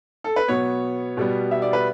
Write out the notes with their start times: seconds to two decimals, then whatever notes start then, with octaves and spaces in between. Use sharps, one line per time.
0.24 A4
0.36 B4
0.48 B2 F#3 B3 C#5
1.17 B2 G3 B3
1.51 E5
1.62 D5
1.73 B4